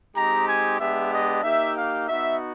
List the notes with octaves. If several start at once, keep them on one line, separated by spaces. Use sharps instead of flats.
G#3 C4 D#4 G4 A#5
G#5
G#3 B3 D4 G4 E5
D#5
A#3 D#4 G4 E5
F5
B3 D#4 F#4 E5